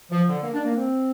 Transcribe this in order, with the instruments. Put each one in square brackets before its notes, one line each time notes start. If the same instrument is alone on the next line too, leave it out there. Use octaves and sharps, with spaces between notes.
[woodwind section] F3
D3
A#3
D4
A#3
C4